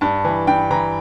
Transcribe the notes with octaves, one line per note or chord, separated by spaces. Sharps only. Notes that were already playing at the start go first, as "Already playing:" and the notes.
G2 A5
E3
G2 G5
E3 A#5